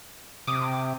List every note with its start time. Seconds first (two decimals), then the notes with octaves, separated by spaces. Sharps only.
0.47 C3 D6 D#6